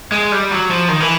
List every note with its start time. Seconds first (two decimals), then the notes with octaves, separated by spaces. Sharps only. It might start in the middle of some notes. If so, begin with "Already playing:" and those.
0.12 G#3
0.32 G3
0.51 F#3
0.71 F3
0.88 D#3
1.00 E3